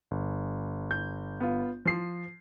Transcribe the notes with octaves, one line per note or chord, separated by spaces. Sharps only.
G1
G6
B3 F4
F3 C7